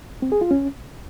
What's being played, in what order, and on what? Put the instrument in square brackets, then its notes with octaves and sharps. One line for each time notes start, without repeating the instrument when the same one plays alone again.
[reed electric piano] C4
G#4
F4
C#4